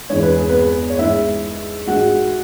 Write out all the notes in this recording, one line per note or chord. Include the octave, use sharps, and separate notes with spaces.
E2 E3 G#3 C#5
B4
G#4
B3 B4
C#5
G#2 G#3 E4 E5
G#2 G#3 F#4 F#5